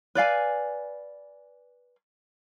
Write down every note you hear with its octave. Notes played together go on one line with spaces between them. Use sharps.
B4 D5 F5 G#5